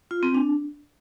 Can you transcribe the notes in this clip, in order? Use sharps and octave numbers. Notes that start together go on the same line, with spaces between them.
F4
C4
D4